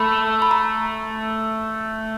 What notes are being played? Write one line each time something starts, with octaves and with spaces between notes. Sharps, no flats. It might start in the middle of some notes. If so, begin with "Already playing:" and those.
Already playing: A3 B5
B5
A#5